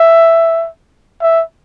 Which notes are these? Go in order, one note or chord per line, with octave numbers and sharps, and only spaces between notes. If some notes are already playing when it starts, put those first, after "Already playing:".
Already playing: E5
E5